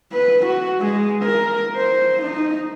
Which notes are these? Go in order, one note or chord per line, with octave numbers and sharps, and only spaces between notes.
B4
F#4
G#3
A#4
C5
D#4